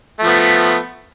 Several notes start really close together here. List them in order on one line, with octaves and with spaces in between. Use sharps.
A3 F3 B3